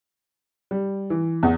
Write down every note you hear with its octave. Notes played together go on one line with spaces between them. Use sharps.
G3
E3
E2